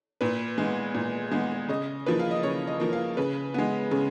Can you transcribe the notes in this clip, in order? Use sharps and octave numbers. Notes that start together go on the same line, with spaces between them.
A#2 B4
G#3 B3
A#2
G#3 B3
C#3 D#5
F3 A#3 B4
F5
D#5
C#3 C#5
D#5
F3 A#3
F5
C#3 B4
G#3 B3
C#3